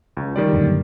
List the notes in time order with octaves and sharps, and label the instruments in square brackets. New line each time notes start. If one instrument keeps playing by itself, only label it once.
[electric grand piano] C#2
D#3 G3 D5
[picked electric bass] F#2 A#2 D3